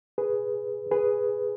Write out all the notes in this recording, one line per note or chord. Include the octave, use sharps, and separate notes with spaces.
G#4 B4
G#4 B4